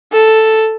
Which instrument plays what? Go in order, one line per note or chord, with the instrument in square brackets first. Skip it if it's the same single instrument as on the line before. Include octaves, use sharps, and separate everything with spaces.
[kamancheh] A4